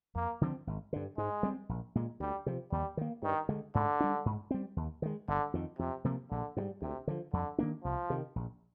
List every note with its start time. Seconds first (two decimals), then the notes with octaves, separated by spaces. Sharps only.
0.15 F2 A#3
0.41 D3 F3 C4
0.67 G#1
0.93 G2 D3
1.17 G#2 G#3
1.43 G3 C4
1.69 A#1
1.95 A#2 G#3
2.20 D2 G3
2.46 C3 F3
2.71 D#2 G3
2.97 D#3 A#3
3.22 G2 D#3
3.49 D3 G#3
3.75 G#2 D3
4.00 G3 D4
4.26 G#2
4.51 G3 C4
4.76 D#2
5.02 D#3 G#3
5.28 G1 D3
5.54 F2 D#3
5.79 F2 C3
6.04 C3 F3 A#3
6.31 A#1 D3
6.57 G#2 D#3 G3
6.82 D2 C3
7.07 D3 F3
7.33 F2 D3
7.58 D#3 A#3 D4
7.84 C2 F3
8.10 C3 D#3
8.36 A#1